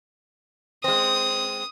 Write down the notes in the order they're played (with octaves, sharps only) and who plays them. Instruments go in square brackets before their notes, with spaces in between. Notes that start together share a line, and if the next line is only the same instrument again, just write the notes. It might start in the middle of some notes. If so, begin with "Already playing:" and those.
[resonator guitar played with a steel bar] G#3 C4 [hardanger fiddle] D#6